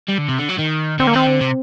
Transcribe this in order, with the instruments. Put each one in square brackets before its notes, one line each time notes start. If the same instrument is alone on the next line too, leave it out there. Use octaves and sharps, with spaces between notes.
[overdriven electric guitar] G3
D3
C3
D3
F#3
D#3
[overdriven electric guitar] D3 [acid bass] C4
[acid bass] A#3
[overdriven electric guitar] D#3 [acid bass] C4
[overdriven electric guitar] D3
C3